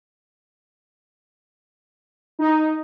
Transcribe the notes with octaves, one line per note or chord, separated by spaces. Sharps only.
D#4